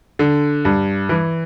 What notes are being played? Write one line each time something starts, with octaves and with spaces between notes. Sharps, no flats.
D3
G2
E3